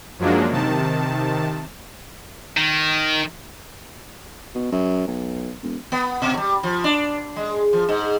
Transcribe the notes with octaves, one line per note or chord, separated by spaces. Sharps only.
F#2 F3 F#3 G#3 A#3 D4
C3 D#3 A5
D#3
B2
F#2
B1
E1
B3
B2
G3
F3
D4
G#3
F3
G#2